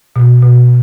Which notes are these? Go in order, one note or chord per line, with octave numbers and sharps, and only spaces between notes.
B2
B2